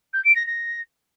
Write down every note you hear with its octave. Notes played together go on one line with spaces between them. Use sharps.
G6
D7
A#6
A#6